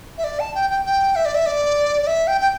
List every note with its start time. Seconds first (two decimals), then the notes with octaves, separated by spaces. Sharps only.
0.18 E5
0.24 D5
0.40 A5
0.55 G5
0.70 G5
0.85 G5
1.16 E5
1.25 D5
1.35 E5
1.46 D5
2.02 D5
2.07 E5
2.27 G5
2.41 G5